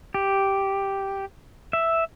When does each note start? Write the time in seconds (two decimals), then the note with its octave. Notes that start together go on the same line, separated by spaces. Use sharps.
0.14 G4
1.73 E5